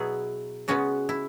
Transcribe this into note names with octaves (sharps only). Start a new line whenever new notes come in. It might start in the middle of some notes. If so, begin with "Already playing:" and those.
Already playing: B2 F#3 B3 E4 F#4 G#4
C#3 G#3 B3 C#4 F#4
E4